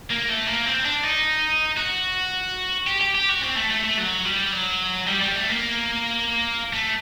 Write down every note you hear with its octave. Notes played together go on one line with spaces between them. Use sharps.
A#3
A3
A#3
C4
D4
D#4
F#4
G4
G4
G4
F#4
C4
A3
A3
A3
F#3
G3
F#3
G3
G3
A3
A#3
A3